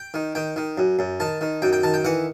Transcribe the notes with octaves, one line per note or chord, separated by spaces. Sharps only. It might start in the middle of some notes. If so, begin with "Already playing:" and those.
Already playing: G5
D#3
D#3 G5
D#3
F#2
F#2
D#3 A5
D#3
F#2 G5
G5
D#3 A5
G5
E3 F#5